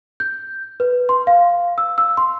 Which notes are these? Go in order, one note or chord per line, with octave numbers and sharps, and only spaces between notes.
G6
B4
C6
F5
E6
E6
C6